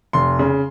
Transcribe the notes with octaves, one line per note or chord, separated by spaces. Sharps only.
F1 C6
C#3